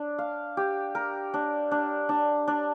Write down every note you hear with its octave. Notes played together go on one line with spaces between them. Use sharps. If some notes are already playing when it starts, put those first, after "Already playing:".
Already playing: D4
F5
G4
A#4
D4
D4
D4
D4